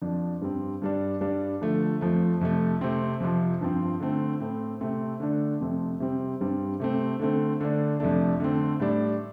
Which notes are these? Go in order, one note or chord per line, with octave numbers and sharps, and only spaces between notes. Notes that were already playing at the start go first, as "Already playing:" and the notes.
F2 F3 D4
G2 G3 C4
G2 G3 D4
G2 G3 D4
D3 F3 A3
F2 F3 A3
F2 C3 A3
C3 A3 C4
F2 C3 F3
G2 F3 C4
D3 A3 C4
A2 A3 C4
C3 A3 C4
D3 A3 D4
F2 C3 A3 C4
C3 G3 C4
G2 G3 C4
C3 A3 C4
D3 A3 C4
D3 A3 D4
F2 C3 A3 D4
D3 A3 C4
A2 G3 D4